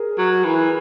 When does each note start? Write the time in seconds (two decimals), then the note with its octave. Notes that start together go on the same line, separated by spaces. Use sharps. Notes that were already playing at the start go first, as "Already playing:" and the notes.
Already playing: G#4 A#4
0.18 F#3
0.44 E3